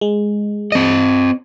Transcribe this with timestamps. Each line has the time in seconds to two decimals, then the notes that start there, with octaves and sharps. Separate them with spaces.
0.01 G#3
0.72 C4 D#5